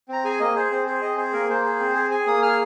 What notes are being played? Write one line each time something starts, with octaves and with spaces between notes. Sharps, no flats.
C4 A#5
G#4 G#5
A#3 D#5
G#4 C5
C4 C5
G#4 C5
C4 D#5
G#4 C5
A#3 A#4
A#3 C5
G#4
C4
G#4
G#4 G#5
A#3 D#6
G#4 F6